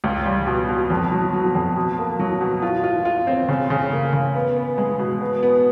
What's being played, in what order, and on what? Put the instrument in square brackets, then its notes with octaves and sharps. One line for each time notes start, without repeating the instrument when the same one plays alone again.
[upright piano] C#2
G3
B2
B2
F2
F#3
F#3
F2
B2
A#3
F#3
B2
F4
F4
F4
C4
C#3
C#3
A#3
C#3
B3
B3
G#3
B2
B3
B3